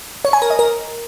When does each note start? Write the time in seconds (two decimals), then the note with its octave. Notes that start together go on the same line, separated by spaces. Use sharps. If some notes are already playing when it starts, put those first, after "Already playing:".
0.25 C#5
0.33 G#5
0.42 A#4
0.50 D#5
0.59 A#4